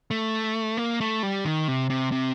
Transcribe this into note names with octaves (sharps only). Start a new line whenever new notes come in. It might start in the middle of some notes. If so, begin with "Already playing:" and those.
A3
A#3
A3
G3
D#3
C3
C3
C3